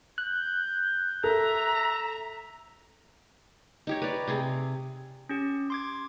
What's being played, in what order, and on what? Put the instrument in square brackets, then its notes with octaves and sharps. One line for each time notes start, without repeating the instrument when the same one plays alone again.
[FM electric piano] F#6 [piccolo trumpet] G6
[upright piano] A4 [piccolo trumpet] E5 [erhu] A#5
[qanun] D#4 G4 C#5
B4 D5
C3 C4 G#4
[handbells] C#4 G4
C6 D6 G#6